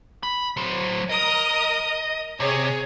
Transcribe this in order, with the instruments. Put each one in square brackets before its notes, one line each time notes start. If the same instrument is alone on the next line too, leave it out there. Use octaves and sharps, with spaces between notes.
[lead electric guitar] B5
F#3 C5
[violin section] A#4 D#6 [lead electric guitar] D#5
[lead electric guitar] C3 [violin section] G#4 C#5